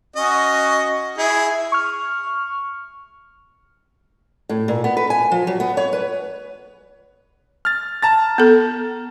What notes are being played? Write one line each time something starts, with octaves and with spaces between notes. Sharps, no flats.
C#4 F#4 D#5
E4 G#4
C#6 F6
A2
A#2
B3
B4
G#5
F3
F#3
B3
C#5
B4
F6 A6
A5 A#5 A6
B3 A4